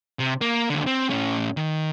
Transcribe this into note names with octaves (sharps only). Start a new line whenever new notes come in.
C3
A#3
D#2 D3
C4
A2 C#4
D#3